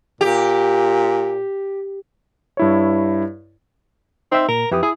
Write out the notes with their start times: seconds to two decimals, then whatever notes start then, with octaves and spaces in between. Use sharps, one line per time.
0.21 A#2 G4
2.57 G2 E4 C#5
4.32 C4 D#4 E5
4.48 A#2 A#4
4.71 F2 E3 G4 D#6
4.83 E4 G#4